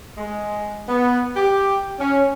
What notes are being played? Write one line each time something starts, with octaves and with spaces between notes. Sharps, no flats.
G#3
B3
G4
C#4